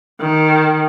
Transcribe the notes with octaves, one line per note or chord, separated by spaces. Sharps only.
D#3